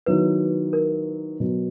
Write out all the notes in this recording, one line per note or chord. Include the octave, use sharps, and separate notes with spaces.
D#3 F#3 B3 E4 B4
A#4
B2 F#3 B3